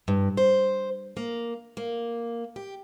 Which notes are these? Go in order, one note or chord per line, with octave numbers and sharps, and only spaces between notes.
G2
C5
A#3
A#3
G4